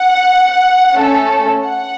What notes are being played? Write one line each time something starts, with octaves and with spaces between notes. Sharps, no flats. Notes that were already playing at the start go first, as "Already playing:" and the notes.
Already playing: F#5
A3 C#4 A4
F#5